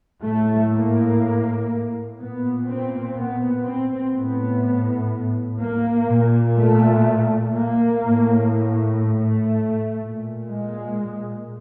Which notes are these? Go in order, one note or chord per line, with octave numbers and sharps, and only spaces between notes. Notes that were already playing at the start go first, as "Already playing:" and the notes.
A2 A3
A#3
A#2 B3
C4
B3
C4
A2 B3
A#3
A#2
A3
A#3
A2
A3
A#2
G#3